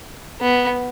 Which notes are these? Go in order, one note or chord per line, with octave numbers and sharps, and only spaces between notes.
B3